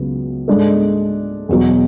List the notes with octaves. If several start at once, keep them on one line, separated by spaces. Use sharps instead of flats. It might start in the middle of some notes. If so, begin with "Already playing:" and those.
Already playing: C#2 C#3 F#3 B3
G#2 G#3 D4 A4
E2 B2 F#3